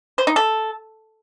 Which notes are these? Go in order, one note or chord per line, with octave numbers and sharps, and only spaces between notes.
C5
D#4
A4